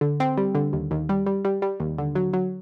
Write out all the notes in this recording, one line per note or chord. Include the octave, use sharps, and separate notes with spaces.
D3
C4
G3
D3
D#2
D#2
G3
G3
G3
G3
D#2
D3
F#3
F#3